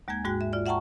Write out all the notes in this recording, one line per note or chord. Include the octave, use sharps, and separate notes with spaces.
D#2 G#3 A#3 G#5 G#6
G#2 G#3 F#4 G5 F#6
E5
F4 D5
E5 F#5 G5 A5 A#5 C#6